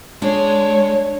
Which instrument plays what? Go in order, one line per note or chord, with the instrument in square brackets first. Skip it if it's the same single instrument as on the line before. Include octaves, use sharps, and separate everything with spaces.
[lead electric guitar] G#3 [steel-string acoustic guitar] D4 [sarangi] C#5